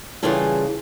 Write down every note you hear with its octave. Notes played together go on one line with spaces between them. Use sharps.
C#3 E3 G3 F4 G#4 A4